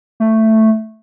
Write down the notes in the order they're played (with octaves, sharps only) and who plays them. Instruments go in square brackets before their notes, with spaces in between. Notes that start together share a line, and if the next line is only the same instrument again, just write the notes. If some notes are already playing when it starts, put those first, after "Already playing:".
[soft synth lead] A3